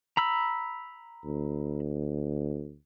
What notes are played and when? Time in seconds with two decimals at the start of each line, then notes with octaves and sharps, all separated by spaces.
0.17 A#5 B5 E6
1.25 D2